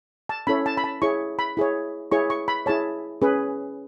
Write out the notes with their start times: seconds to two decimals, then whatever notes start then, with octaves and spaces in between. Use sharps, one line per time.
0.29 A5
0.47 C#4 E4 A4 C#5 B5
0.66 A5
0.77 B5
0.84 A5
1.02 E4 G#4 C#5 C#6
1.39 B5
1.57 E4 G#4 C#5
2.12 E4 G#4 C#5 C#6
2.30 C#6
2.48 B5
2.66 E4 G#4 C#5 A5
3.22 C#4 G#4 B4